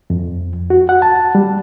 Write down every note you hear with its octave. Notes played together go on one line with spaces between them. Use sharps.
F2
F#4
F#5
A5
G3